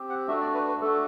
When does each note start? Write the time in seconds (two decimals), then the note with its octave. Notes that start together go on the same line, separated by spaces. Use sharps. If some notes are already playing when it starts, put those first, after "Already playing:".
Already playing: C4 G4
0.10 F#5
0.28 A3 D4 F#4 E5
0.41 D5
0.54 B4
0.68 B4
0.81 A3 D4 F#4 A4